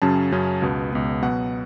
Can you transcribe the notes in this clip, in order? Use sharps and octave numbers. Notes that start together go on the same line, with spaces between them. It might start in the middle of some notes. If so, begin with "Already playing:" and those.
F#2 C#3 F#3 C#4 A5
F#2 C#3 F#3 C#4
C#2 B2 B3
C#2 B2 B3
B2 F#3 B3 F#5